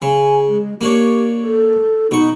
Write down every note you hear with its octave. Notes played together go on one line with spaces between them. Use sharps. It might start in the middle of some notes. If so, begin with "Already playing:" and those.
C#3 G#5
G#3
A#3 D4 G4 C#5
A4
B2 D#4 C#6